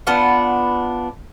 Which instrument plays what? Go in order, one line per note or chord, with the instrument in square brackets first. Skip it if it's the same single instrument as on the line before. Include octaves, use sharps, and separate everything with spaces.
[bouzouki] B3 D4 F4 F#5